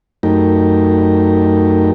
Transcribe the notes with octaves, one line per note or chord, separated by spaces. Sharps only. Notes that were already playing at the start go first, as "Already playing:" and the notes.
F#2 A3 D#4 G4 A#4